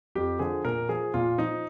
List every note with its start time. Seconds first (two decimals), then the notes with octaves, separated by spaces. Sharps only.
0.15 F2 G4
0.39 D3 F3 G#4
0.65 A#2 A#4
0.88 F3 G#4
1.14 A#2 F4
1.38 F3 D#4